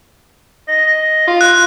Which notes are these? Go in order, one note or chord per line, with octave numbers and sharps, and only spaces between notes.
D#5
F4
F#6